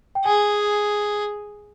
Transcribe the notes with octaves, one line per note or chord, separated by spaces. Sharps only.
G5
G#4 G#5